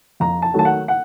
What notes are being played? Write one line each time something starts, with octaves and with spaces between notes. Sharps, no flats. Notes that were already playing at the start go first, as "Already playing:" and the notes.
F2 A#5
A5
D#3 F#3 A3 A5
F#5
F#5